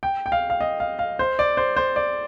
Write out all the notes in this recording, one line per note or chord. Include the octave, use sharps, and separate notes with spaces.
G5
G5
F5
F5
D#5
F5
F5
C5
D5
C5
C5
D5